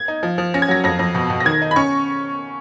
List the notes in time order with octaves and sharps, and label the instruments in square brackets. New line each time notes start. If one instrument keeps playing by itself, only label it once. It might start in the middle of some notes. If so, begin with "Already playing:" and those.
Already playing: [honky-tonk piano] G#6
D#4
F3
F3
C#4 A#6
G#6
F#3 A#6
F2 A#6
F2
B2
B2
A#6
D#3 G#6
D#4
B5
C#4 C#6